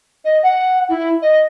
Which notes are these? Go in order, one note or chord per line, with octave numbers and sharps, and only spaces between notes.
D#5
F#5
E4
D#5